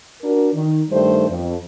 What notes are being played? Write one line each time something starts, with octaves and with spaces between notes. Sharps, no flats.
D4 F#4 A#4
D#3
G2 D#3 G3 A3 C5
F2